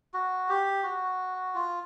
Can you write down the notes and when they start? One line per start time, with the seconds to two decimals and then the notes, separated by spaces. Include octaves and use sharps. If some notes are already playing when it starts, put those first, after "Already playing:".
0.14 F#4
0.49 G4
0.83 F#4
1.55 F4